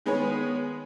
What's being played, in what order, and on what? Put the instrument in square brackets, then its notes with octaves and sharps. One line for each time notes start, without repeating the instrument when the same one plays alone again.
[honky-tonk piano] D#3 G#3 B3 G#4 B4 C#5